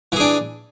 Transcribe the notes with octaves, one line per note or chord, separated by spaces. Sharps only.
E3 D4 G#4